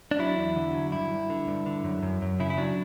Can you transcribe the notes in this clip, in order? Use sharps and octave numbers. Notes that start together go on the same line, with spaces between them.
D4
F#3 E4
E2
D3
F#3
G2 E4
G2
D3
G2
D3
F#2
F#2
F#2
C#3 E4
E4
F#3 D4